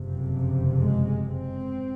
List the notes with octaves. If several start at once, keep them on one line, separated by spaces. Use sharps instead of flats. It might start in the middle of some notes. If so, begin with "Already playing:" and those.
Already playing: F#1 F2 C3
G#3
C4